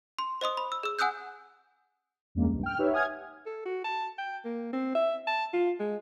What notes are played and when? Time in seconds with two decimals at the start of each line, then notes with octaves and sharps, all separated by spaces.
0.19 C6
0.41 C5 D#5 C6 D#6
0.57 B5
0.72 E6
0.83 G#4 E6
0.99 F#5 G#5 D#6 E6 F#6 G6
2.35 E2 G2 C#3 G#3 A#3
2.48 C2 G2
2.63 G5 F6
2.78 D#4 G4 B4 C#5 E5
2.92 F#5 G#5 D#6 F6 G#6
3.46 A4
3.65 F#4
3.84 A5
4.18 G5
4.45 A#3
4.73 C4
4.95 E5
5.27 A5
5.53 F4
5.80 G#3